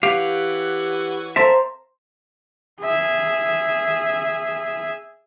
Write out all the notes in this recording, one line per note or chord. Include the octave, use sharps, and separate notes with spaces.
E3 G4 C#5 F5 F#5
A4 A#4 C5 E5 A#5
G#4 E5